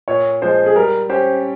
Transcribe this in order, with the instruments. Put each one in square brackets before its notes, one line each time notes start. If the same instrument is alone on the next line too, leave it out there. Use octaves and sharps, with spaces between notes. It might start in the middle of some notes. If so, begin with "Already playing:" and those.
[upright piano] A#2 [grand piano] C#5
[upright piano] F3 G#3 [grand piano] C5
[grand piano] G#4
[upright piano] G3 [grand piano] A#4
[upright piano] C#4 G4 [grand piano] C5